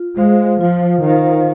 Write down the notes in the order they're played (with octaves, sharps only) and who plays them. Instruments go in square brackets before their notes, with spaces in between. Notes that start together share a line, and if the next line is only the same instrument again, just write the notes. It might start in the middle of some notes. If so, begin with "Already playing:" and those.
Already playing: [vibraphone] F4
[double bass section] G#3 [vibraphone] C5 F5
[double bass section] F3 [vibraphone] F4
[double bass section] D#3 [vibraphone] C5 F5